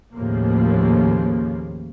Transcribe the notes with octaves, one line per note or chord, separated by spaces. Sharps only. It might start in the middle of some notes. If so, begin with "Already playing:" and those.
D#2 A2 C#3 F3 A#3